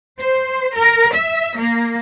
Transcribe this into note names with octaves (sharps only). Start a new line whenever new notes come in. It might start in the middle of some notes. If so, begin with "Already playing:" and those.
C5
A#4
E5
A#3